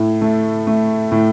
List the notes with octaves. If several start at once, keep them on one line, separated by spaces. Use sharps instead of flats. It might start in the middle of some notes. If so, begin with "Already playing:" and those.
Already playing: A2
A3
A3
A2